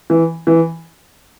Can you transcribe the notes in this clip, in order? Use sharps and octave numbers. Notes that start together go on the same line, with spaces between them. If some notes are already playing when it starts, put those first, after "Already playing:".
E3
E3